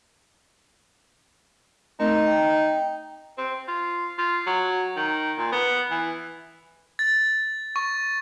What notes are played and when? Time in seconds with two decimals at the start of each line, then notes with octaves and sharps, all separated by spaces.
2.00 A3 C4 D#4 A#4
2.27 G5
3.38 C4
3.68 F4
4.18 F4
4.46 F#3
4.96 D#3
5.38 A#2
5.52 B3
5.91 E3
6.99 A6
7.76 C#6